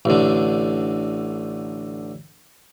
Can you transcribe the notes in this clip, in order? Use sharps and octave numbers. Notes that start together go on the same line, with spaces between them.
A1 D3